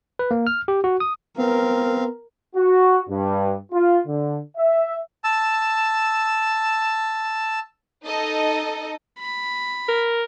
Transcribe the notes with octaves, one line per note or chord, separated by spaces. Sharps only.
B4
A#3
F6
G4
F#4
D#6
B3 C4 A#4 F5
F#4
G2
F4
D3
E5
A5 E6
D#4 A4 D#5
B5
A#4